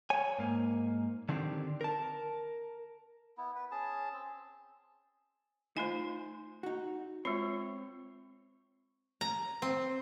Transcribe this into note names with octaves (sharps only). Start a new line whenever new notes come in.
C#5 G#5
G#2 A#3
D3 D#3 C4 D4 F#4 G4
A#4 A5
B3 E4
B4
C#4 G#4 A5
C4
A3 D#4 F4 C5 G#5
D#4 F#4
G#3 C4 F4 C#5
A#5
C4